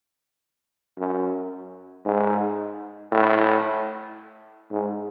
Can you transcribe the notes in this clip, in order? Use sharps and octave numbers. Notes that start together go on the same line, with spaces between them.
F#2
G#2
A2
G#2